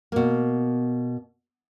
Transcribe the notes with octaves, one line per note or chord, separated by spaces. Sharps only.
B2 A#3